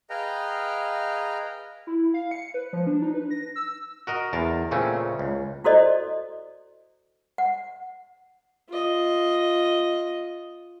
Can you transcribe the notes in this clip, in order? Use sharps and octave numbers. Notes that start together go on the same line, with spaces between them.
G#4 B4 D#5 F5 G5 A#5
E4
F5
C#7
B4
F3
D4
D#4
B4
A#6
E6
F#4 A#4 D#5
E2 A#4 A5
A#2 C#3 A3 C4 C#4
C#2
E4 F#4 A4 C5 D5 D#5
F#5
F4 D#5